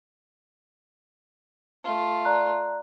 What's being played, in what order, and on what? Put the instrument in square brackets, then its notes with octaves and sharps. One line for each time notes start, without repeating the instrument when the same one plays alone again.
[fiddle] A3 F4
[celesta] D5 A#5 F#6